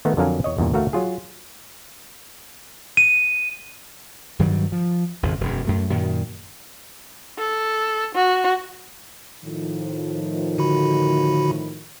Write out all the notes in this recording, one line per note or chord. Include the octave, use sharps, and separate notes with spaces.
D#3 A3 B3 D#4
F2 D3 F#3 A#4 F5 G#5
E2 C#5 D#5
E2 G2 A#2
D2 A3 F#4 A#4 F5
F#3 F4 G#4
D#7
G2 D#3 F#3 G3
F3
G#1 F2 C#3 F3
E1 F#2
F#2 A3
F#2 A#2 D#3
A4
F#4
A2 D#3 F3
D3 F#4 B5